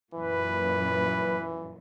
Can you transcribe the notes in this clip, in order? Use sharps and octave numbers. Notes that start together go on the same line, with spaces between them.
F#2 A#2 E3 B4